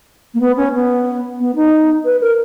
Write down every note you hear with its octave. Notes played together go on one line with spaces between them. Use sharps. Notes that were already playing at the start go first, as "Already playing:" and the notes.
A#3
B3
C#4
B3
B3
D#4
B4
A#4